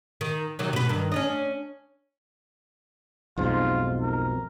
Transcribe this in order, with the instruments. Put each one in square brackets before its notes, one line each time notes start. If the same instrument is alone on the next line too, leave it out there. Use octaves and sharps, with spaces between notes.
[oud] D#3
C3 D#3 F#3
B2 B4
G2 D#3
C#4 D4 D#5
[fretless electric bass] B1 F2 G#2 [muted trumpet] F4
[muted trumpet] A#4